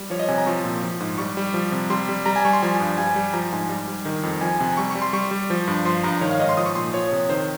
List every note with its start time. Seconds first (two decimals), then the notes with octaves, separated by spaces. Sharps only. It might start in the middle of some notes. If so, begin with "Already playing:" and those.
Already playing: G3
0.10 F3 C#5
0.19 D#5
0.28 C3 G#5
0.38 A#5
0.46 F3 C#6
0.64 A#2
0.83 F3
1.00 G#2
1.18 G3 C#6
1.37 G3
1.54 F3
1.72 C3
1.90 G3 C6
2.09 G3
2.26 G3 A#5
2.36 G#5
2.45 G3 C#6
2.53 C6
2.62 F3 G#5
2.80 G2
2.98 G3 G#5
3.16 G3
3.33 F3 A#5
3.53 G#2 G#5
3.69 G3
3.87 G3
4.05 D#3
4.23 F2
4.41 F3 G#5
4.59 C3 G#5
4.77 G3 C#6
4.90 C#6
4.95 G3
5.02 C6
5.13 G3 C#6
5.31 G3
5.50 F3
5.68 G2
5.85 F3 C6
6.03 G2 A#5
6.21 D#3 C#5
6.31 F5
6.39 G#2 D#5
6.49 C6
6.57 F3 D#6
6.66 C#6
6.75 A#2 C6
6.93 F3 C#5
7.12 C3
7.29 D#3 C5